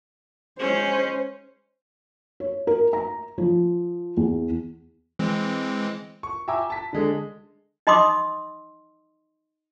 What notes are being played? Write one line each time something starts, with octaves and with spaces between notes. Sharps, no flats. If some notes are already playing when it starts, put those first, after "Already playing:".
G#3 C#4 C5
C#5
A#4
A#5
F3
E2
E3 G#3 C4
C#6
E5 G5 G#5 A#5 D6 E6
A5 B6
D3 G#3 A4
D#4 D#5 B5 C6 D6 D#6